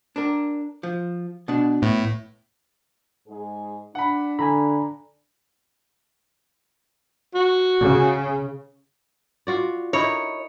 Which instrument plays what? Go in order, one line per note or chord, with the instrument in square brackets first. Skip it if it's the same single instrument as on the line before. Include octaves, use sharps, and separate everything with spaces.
[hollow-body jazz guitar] D4 A#4
F3
B2 D4
[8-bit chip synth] A2 [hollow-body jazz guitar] B3
[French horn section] G#2 G#3 G#4
[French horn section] D4 [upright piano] F#5 B5
[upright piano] D3 [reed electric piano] G#5 A#5 B5
[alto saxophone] F#4
[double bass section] C#3
[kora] F4 F#4 D5
[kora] D#4 E4 A#4 [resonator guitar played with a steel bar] C#5